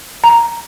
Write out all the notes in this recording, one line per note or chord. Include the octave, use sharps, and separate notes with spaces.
A#5